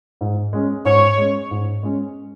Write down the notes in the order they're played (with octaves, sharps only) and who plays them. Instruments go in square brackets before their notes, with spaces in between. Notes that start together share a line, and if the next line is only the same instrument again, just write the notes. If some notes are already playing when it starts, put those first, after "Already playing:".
[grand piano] G#2
G#3 C#4
[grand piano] G#2 [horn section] C#5
[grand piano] G#3 C#4
G#2
G#3 C#4